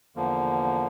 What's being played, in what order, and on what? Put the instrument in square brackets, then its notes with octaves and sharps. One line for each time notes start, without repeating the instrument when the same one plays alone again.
[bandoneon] E2 D3 F3 A#3